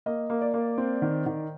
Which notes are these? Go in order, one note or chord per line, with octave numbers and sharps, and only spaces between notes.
A#3 D#5
A#3
D5
A#3
C4
D#3
D#3